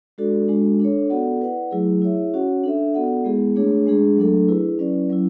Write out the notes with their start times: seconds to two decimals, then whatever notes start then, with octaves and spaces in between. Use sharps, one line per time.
0.18 G#3 D4 F#4 A4 D5
0.48 G#3 D4 F#4 A4
0.80 D4 A4 C#5
1.10 B3 F#4 A4 D5 F#5
1.41 E4 B4 D5 F#5
1.71 F#3 A3 E4 G#4
2.02 E4 G#4 C#5 E5
2.34 C#4 F#4 C#5 F#5
2.64 D4 A4 E5
2.94 B3 F#4 A4 D5 F#5
3.25 G#3 B3 E4 G#4
3.55 A3 D4 G#4 C#5
3.87 G#3 D4 G#4
4.17 F#3 A3 D4 A4
4.48 E4 G#4 B4
4.79 F#3 C#4 E4 B4 D5
5.10 F#3 C#4 E4